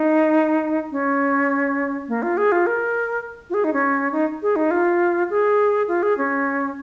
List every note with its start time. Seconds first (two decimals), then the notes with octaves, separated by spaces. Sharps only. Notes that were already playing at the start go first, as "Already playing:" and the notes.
Already playing: D#4
0.92 C#4
2.08 A#3
2.23 F4
2.37 G#4
2.52 F4
2.67 A#4
3.50 F4
3.54 G#4
3.64 D#4
3.73 C#4
4.12 D#4
4.42 G#4
4.56 D#4
4.71 F4
5.30 G#4
5.88 F4
6.03 G#4
6.18 C#4